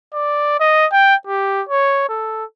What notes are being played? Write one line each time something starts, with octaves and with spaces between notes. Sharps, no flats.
D5
D#5
G5
G4
C#5
A4